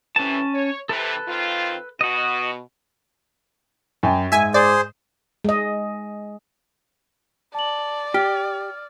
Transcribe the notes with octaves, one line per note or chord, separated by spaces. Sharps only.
A2 C3 E3 C#4 A5
C#5
C3 E3 A4 B4
D#3 C4 F4
B2 F#4 D#5
F#2 G5 G#5
G#2 E5 G#5
G#4 C5 D5
G#3 D#5
D5 A5 F#7
G4 F6